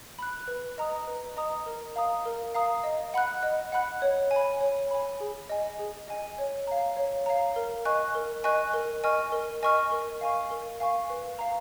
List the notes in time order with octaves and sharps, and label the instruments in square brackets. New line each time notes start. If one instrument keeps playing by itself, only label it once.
[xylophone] B5 F#6
B4
D#5 A#5 D#6
B4
D#5 A#5 D#6
A#4
F5 A#5 D#6
A#4
F5 A#5 D#6
D#5
F#5 B5 F#6
D#5
F#5 B5 F#6
C#5
G#5
B5
C#5
G#5 B5
G#4
D#5 G#5
G#4
D#5 G#5
C#5
F5 A#5
C#5
F5 A#5
A#4
D#5 G#5 C#6 F#6
A#4
D#5 G#5 C#6 F#6
A#4
D#5 G#5 C#6 F6
A#4
D#5 G#5 C#6 F6
A#4
F5 G#5 C#6
A#4
F5 G#5 C#6
B4
F5 A#5